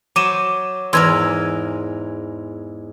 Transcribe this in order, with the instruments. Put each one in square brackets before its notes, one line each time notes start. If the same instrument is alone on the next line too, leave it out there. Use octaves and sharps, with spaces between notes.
[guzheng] F#3 C5 [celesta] D6 D#7 E7
[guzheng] E2 G#2 A#4 [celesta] C6 E6 G#6